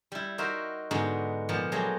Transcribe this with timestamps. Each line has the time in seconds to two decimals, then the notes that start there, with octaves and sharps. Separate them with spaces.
0.12 G3 E4
0.38 D#4 F#4 A#4 C5 E5
0.91 G#2 D3 B3 D#4 F#4 B5
1.49 A#2 F3 B3
1.72 F#3 G#3 A3 G4 G#4